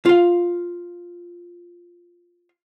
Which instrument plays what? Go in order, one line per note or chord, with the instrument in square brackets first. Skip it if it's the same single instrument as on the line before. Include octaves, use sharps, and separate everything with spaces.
[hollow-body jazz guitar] F4 F5